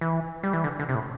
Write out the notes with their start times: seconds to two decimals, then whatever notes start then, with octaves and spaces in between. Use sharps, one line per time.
0.01 E3
0.43 G3
0.53 E3
0.64 D3
0.79 D3
0.89 C3
0.95 A2